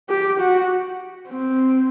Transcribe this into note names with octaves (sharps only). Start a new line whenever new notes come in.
G4
F#4
C4